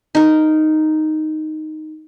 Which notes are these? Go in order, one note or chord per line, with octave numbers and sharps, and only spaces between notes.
D#4 A#4